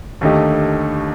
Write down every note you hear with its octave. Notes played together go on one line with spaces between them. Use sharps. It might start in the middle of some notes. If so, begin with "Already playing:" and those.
D#2 D3 A3 D#4 G4